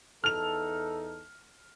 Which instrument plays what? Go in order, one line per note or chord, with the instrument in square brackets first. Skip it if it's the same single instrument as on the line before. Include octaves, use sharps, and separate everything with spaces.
[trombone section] E2 D#4 A4 [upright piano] F6 F7